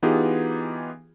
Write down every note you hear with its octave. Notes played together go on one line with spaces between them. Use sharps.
E3 B3 D#4 F4 G4 G#4